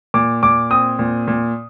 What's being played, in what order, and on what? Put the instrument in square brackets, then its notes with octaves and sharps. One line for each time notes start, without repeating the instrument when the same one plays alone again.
[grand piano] A#2 D6
A#2 D6
C4 D#6
A#2
A#2